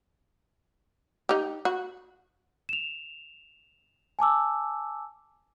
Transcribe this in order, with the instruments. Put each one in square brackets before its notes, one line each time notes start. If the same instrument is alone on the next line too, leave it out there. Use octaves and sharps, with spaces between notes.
[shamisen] D#4 G4
F#4
[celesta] E7 F7
G#5 A5 D6 E6